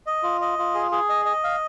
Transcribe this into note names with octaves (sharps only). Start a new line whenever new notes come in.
D#5
F4
D#5
F4
G#4
G#4
D#5
D#5
F5